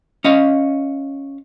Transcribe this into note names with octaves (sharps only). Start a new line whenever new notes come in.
C#4 D#5 F5